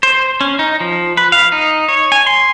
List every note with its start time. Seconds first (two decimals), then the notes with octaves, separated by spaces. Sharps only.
0.03 C5
0.41 C#4
0.59 D#4
0.80 F3
1.17 B4
1.32 F5
1.52 D#4
1.88 C#5
2.12 G#5
2.27 C6